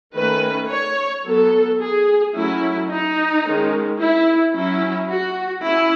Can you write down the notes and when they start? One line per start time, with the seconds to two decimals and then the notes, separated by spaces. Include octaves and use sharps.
0.15 D#3 A3 C#4 B4
0.70 C#5
1.25 F#3 B3 A4
1.80 G#4
2.35 F#3 A3 C#4 E4
2.90 D#4
3.45 D#3 G#3 C#4
4.00 E4
4.56 F#3 C#4 E4
5.10 F#4
5.65 C#4 E4